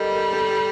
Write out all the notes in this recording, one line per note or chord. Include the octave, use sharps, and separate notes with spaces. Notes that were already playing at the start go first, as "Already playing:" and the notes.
Already playing: G3 A4 A#4 D#5
A#4
A4